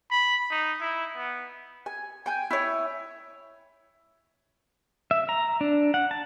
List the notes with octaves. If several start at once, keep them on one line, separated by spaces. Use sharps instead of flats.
B5
D#4
E4
B3
G#5
G5 G#5 G6
E4 C#5
E5
A#5
D4
F#5
A5